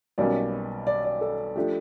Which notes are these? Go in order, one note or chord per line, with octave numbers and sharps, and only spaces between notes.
B1 B2 G3 A#3 C#4 D5
D5
D5
A4
F3 A3 D4 G4